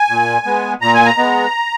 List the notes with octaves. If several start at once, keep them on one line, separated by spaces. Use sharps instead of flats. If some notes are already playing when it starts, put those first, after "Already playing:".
Already playing: G#5
A#2
G#3 B3
A#2 A#5
G#5
A#5
G#3 B3